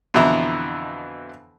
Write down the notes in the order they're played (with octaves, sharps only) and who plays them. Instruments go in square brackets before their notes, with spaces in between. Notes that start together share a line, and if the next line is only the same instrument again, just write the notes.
[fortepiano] F2 B2 D3 E3 E4 A#5